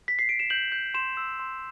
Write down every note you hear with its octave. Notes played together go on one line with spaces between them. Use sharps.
B6
C7
D7
E7
G6 F#7
G6
C6 E7
E6
C6